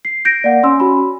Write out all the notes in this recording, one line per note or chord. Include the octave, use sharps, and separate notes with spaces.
C7
G6 A#6 D7
A#3 D5 F#5
C#4 C6 E6
F#4 B5